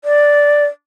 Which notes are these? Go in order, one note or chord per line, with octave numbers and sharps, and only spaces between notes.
D5